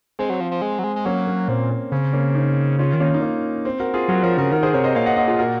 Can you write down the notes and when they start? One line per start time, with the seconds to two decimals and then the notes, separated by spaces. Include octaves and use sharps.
0.19 G#3 C4
0.30 F#3
0.40 F3
0.51 F3
0.62 G#3
0.79 F#3
0.84 G#3
0.96 G#3
1.05 F#3 A#3 C#4
1.27 A#3
1.48 A#2 C4
1.70 C4
1.92 C#3 C4
2.13 A#3 C#4
2.35 C4 D#4
2.79 C#3 C#4 F4
2.93 D#3
3.00 A#3 C#4
3.14 D#4
3.21 A#3 C#4
3.65 C4
3.80 F#4 A#4
3.94 F4 G#4
4.08 F#3 F#4 A#4
4.23 F3 A#4 C#5
4.37 C#3 F#4 A#4
4.52 D#3 F#4 A#4
4.63 G#4 C5
4.73 C3 A#4 C#5
4.84 C5 D#5
4.95 A#2 C#5 F5
5.06 D#5 F#5
5.16 A#2 D#5 F#5
5.28 F4 G#4
5.38 A#2 F#4 A#4